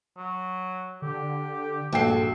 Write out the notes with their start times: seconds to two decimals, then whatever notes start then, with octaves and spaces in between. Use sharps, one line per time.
0.17 F#3
1.02 D3 G4
1.93 A#1 G2 F#4 A4 G5 C7